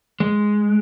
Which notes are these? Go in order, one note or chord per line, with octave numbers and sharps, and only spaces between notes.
G#3